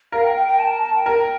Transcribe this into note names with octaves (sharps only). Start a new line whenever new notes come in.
A#4 F5
G5
G5
G5
A5
A5
A5
G5
A#4